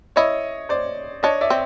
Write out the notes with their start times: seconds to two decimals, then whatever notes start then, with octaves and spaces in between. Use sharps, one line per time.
0.16 E4 C#5 D#5
0.69 C5 D5
1.23 D4 C#5 D#5
1.41 D5 E5
1.50 C4